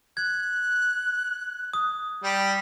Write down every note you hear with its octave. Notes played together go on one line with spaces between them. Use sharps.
F#6 G#6
D#6
G3 G4